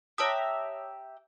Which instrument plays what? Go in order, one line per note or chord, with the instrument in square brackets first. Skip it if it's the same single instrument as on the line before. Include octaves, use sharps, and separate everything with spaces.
[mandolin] G4 E5 A#5 [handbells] C#5 A5 D#6